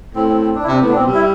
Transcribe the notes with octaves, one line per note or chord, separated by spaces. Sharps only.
A2 C4
C4
C4
D4
E4
C3 D4
A2 B3
D4
B2 C4
G3
E4